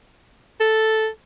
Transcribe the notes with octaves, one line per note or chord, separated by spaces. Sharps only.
A4